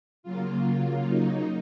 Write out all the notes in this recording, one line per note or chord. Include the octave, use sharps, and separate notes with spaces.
C#3 F#3 A#3 F4
D#4